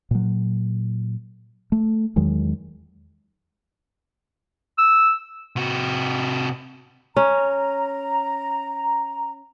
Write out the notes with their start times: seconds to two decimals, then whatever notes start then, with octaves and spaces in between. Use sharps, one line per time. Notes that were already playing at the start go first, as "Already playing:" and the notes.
0.11 A#2 F#3
1.72 A3
2.16 E2 D#3 F#3 G#3
4.78 E6
5.56 C3 F#4
7.17 C#4 A#5